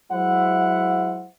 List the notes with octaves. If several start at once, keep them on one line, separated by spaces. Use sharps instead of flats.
F#3 G#3 E4 C5 E5 F#5